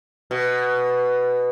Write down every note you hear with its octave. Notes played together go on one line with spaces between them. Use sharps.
B2